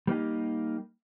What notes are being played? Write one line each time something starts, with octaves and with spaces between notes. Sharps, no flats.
G3 A#3 D#4 G4